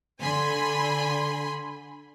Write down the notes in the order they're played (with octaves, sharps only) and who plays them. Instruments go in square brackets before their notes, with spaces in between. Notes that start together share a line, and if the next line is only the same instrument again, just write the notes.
[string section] D3 G#5 B5 C6